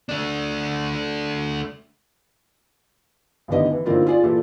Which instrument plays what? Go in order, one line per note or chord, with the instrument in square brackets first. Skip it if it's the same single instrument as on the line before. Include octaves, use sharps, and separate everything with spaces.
[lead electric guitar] A3 D4
[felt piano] A1 D3 D#3 B3 G4 D#5
E3
A2 D3 A#3 C4 D#4 F4
F4 G#4 D5
A#2 E3 F4 G4 A4